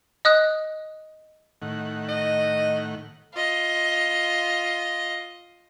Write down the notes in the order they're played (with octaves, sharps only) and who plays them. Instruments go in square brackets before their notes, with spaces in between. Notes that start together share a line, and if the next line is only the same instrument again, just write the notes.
[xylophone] D#5 D#6 F#6
[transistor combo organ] A2 D#3 F#5
[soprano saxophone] D#5
[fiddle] F4 D#5